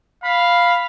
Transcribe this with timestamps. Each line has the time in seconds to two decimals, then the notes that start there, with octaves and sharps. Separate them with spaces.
0.24 F5 B5